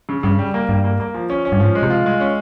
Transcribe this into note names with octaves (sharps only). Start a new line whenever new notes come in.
C#3
G2 C#3
G3
A#3
G2 G3
A#3
A#3
F3
C#4
C#4
G2
G#2 F3
G#3
C3
F4
G#3
C#4